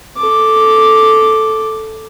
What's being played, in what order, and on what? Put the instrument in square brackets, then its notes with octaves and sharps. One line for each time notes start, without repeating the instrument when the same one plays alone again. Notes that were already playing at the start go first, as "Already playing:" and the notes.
[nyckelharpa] A4 D6